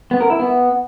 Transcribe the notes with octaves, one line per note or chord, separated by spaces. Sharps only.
B3
A#4
E4
B3